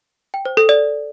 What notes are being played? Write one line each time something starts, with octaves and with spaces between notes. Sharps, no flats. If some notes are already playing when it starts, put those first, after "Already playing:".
G5
C5
A4
D5